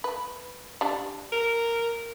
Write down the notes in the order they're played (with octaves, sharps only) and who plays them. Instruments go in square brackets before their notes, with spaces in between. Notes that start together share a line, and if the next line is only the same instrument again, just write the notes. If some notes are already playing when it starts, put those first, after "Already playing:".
[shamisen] B4
G3 D4
[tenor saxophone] A#4